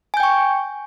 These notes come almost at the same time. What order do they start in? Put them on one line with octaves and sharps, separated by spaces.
G#5 G6 G5 C#6